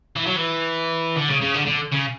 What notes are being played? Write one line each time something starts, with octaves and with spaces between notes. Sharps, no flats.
E3
F#3
E3
D3
C#3
C#3
D3
D3
C#3